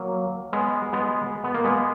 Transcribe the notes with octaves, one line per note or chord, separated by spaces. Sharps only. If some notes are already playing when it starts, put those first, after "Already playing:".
Already playing: F#3 A#3
G#3 B3
G#3 B3
B3
A#3
G#3 B3